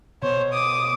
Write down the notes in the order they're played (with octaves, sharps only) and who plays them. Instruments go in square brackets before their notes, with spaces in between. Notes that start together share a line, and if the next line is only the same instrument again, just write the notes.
[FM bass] B2 [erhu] C5 [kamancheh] C#5
[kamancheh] D6 [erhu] D#6